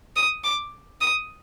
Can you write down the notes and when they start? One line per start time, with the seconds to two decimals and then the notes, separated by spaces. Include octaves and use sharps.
0.16 D#6
0.44 D6
1.01 D#6